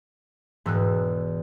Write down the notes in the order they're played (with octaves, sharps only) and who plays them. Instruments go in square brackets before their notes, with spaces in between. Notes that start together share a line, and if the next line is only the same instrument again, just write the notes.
[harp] E1 [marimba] G#2 E6 F#6